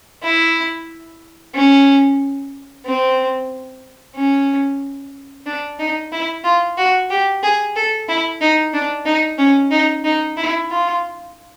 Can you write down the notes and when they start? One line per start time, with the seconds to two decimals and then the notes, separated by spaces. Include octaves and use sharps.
0.23 E4
1.54 C#4
2.85 C4
4.16 C#4
5.46 D4
5.79 D#4
6.12 E4
6.44 F4
6.78 F#4
7.10 G4
7.43 G#4
7.76 A4
8.08 E4
8.41 D#4
8.74 D4
9.06 D#4
9.38 C#4
9.71 D#4
10.04 D#4
10.37 E4
10.70 F4